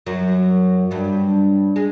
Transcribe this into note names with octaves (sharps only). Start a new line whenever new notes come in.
F#2 F#3
G2 G3
G#3